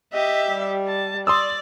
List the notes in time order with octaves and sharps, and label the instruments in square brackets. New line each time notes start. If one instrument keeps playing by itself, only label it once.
[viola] G4 E5 [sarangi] D#5
[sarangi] G3
[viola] A5
[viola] D5 [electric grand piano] C6 D#6 E6